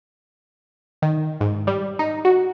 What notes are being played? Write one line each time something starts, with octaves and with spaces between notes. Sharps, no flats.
D#3
G#2
G3
D#4
F#4